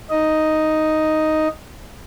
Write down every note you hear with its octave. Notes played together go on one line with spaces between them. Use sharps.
D#4 D#5